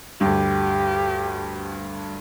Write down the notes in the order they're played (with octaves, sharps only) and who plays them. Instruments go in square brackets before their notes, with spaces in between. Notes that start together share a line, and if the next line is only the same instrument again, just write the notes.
[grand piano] D2 G2 [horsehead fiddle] G4